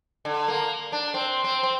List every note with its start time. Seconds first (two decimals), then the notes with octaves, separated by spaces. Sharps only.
0.25 D3
0.48 A#3
0.92 D4
1.14 C4
1.44 C4
1.63 C4